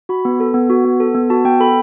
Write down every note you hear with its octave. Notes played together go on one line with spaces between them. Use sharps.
F#4 B5
B3
A4
B3
F#4
B3
A4
B3
F#4 A5
B3 G5
A4 B5